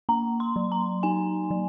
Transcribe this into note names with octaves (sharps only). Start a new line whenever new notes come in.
A#3 A#5
C6
F#3
A#5
D#4 G#5
F#3